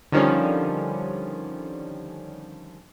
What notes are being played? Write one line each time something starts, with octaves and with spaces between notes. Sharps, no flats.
D3 D#3 F3 G3 C#4